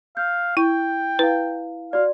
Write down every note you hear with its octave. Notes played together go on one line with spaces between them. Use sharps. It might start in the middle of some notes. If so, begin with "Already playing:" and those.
F5 G6
E4 G5
E4 B4 F5
F#4 D5 F5